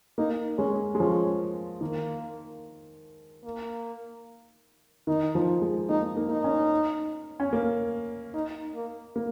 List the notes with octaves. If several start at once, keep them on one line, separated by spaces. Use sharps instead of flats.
A#3 D#4
G#3 C#4
G#3
F3 C#4
D#3 A#3
A#3
D#3 D#4
F3
G#3
A#3 D#4
A#3
D#4
C#4
C#4
A#3
D#4
A#3
A#3